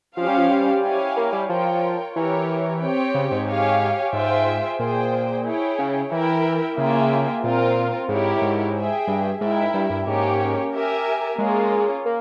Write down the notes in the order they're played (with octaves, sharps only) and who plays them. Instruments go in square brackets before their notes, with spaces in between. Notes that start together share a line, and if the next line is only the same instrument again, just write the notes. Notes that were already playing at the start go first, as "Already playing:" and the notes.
[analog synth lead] F3 [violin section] C#4 G4 C5 F5
[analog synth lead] G3
F3
G3
[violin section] E4 G4 C#5 F5 G#5
[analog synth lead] A#3
G3
[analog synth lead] F3 [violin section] F4 A#4 C#5 G5
[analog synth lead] E3 [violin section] G4 A#4 C#5
[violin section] C4 G4 C#5 G5
[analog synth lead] C#3
G#2
[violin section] G4 C#5 F5 G#5
[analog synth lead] G#2 [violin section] F4 G#4 C5 E5 G5
[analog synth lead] A#2 [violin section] G#4 C5 G5
[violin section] E4 G#4 C#5 G5
[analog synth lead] C#3
[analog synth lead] E3 [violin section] E4 A#4 E5 G5
[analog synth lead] C#3 [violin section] A#3 F4 G#4 E5 G5
[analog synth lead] A#2 [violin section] C4 F4 A#4
[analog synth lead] G#2 [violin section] E4 G4 A#4 C#5
[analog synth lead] G#2
[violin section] G#4 E5 G5
[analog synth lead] G2
[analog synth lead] G#2 [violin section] E4 A#4 E5 G5
[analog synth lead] G2
G2
[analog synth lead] G#2 [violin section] A#3 C#4 G4 A#4 C#5
[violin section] G4 A#4 E5 G#5
[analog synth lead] G#3 [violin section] A#3 C#4 F4 G#4 C#5
[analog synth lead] A#3